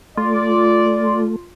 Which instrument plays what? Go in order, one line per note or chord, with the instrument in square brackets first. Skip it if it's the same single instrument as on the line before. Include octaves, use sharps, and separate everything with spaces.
[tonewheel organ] A3 [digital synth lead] F4 [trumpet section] D5